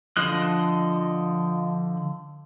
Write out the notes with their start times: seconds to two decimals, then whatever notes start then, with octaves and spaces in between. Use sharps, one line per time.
0.17 D3 F3 D#5 F#6